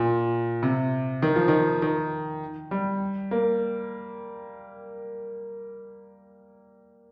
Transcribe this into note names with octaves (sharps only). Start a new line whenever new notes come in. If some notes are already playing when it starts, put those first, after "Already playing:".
Already playing: A#2
C3
D#3
F3
D#3
D#3
G3
A#3